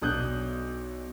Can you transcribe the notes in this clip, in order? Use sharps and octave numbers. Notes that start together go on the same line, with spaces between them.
B1 D4 D#6 F#6 G6